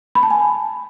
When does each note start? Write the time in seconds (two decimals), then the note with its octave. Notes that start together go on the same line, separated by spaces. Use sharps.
0.15 B5
0.23 A5
0.30 G#5